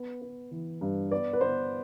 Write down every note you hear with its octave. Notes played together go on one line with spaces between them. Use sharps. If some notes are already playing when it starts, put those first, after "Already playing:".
Already playing: B3
B3
E3
G2
B3 D5
B4
B3 C5